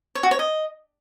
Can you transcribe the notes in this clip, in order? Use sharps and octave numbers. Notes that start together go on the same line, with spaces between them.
C#5
F#4
C#5
D#5